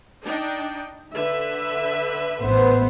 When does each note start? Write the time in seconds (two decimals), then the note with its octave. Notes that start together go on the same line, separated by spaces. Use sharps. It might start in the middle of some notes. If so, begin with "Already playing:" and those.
0.24 D4 D#4 G5
1.13 D3 B4 E5
2.42 A1 B3 C5